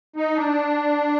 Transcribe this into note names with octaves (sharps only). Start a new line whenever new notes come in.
D#4
D4